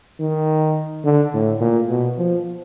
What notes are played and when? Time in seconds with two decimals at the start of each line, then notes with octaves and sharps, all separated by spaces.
0.20 D#3
1.04 D3
1.33 A2
1.60 A#2
1.89 B2
2.18 F3